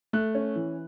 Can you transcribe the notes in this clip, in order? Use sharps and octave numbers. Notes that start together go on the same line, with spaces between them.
A3 F#6
C#4
E3